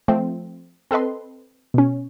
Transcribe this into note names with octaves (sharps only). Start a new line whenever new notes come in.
F3 A3 C4
C4 A4 B4 D#5 C6
B2 C#4